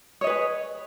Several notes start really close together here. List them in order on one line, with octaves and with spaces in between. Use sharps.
C#5 D#5 B4 G#4